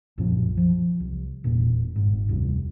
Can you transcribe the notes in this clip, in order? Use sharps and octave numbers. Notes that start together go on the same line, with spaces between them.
B1 F#2 A#2 F3
F3
C2
E1 A#2 D4
G1 G#2
F1 D2 C3 G3